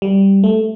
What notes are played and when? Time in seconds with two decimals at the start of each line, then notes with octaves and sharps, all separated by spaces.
0.02 G3
0.44 A3